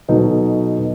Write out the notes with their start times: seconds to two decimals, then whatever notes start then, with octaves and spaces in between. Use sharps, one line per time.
0.08 B2 F#3 B3 D#4 A4
0.79 B2